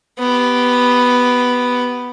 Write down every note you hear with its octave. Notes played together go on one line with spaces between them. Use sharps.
B3 G4